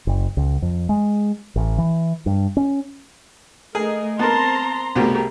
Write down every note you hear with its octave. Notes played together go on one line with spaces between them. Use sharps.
F#1
C#2
F2
G#3
A1
E3
G2
C#4
A3 G#4 A#4 D#5
B3 C4 A#4 A5 A#5 C6
C2 B2 A3 G4 G#4 A#4